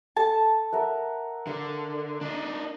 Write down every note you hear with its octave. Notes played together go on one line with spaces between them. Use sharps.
A4 A5
A#4 E5 F#5
D3 F5
D4 D#4